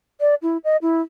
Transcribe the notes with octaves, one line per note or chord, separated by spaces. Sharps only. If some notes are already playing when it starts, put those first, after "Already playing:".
D5
E4
D#5
E4